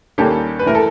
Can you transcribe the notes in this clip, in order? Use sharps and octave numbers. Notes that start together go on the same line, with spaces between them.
D#2 D#3 G3 A#3 C#4 G4 A4
B4
E3 A3 A#4
A4